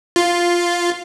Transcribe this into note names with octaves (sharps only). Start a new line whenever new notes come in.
F4